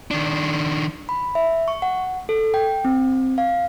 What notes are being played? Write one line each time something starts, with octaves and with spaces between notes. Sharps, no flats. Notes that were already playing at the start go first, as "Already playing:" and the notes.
D#3 D4
B5
E5
C#6
F#5
A4
G5
C4
F5